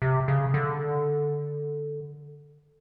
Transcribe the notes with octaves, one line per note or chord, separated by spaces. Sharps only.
C3
C#3
D3